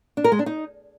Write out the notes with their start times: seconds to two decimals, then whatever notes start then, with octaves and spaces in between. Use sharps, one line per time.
0.17 D4
0.24 A#4
0.32 G#3
0.39 D4
0.46 D#4